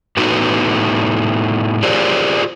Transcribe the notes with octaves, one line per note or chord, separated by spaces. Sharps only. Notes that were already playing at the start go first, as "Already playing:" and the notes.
A2 A3 B3 D#4 F#4
F4 G4 G#4 A#4 C5 D5